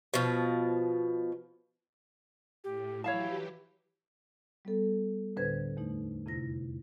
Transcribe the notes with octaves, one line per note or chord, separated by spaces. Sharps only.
B2 F3
A2 G4
E3 F#3 E4 G4 C#5 F5 A5
G3 B3 A4
D2 A2 D3 B4 C5 G#6
E2 A3 D#4
F2 C3 E4 A#6